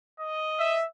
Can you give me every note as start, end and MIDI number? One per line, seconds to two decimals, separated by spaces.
0.20 0.80 75
0.59 0.85 76